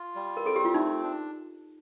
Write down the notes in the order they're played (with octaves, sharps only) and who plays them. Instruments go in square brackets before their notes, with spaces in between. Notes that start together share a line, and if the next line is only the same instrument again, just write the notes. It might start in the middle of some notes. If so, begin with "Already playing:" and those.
Already playing: [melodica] F4
G3
[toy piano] A#4
[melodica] C4 [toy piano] A4
[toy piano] G4
F4
[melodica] A3 [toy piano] D#4
[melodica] D4